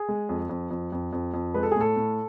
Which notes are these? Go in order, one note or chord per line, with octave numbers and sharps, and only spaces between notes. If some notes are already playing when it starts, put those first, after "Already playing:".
Already playing: G#4
G#3
F2
F2
F2
F2
F2
F2
G#3 B4
A4
G#4
A2 A4
A2